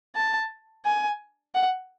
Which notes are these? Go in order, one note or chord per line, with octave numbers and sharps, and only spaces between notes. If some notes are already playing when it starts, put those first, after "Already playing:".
A5
G#5
F#5